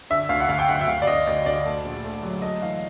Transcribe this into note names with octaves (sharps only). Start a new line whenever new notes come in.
D3 E5
D2 F5
F#5
D2 F5
G5
D2 F#5
E5
D2 F5
D5
D2 D#5
D2 D5
D2 D5
A3
A#1
A3
F#3
A3 D#5
E3 F5